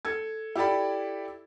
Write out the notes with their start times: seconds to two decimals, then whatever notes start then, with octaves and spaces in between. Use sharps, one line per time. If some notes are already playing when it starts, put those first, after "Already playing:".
0.05 A4 G#6
0.56 E4 G4 A4 D5 B5